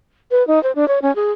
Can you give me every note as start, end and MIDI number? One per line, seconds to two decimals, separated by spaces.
0.31 0.46 71
0.48 0.61 63
0.63 0.72 72
0.75 0.87 62
0.88 0.99 73
1.02 1.14 61
1.16 1.32 68